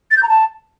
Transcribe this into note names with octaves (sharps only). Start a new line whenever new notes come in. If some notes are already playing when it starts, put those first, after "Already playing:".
A6
G6
A#5
A5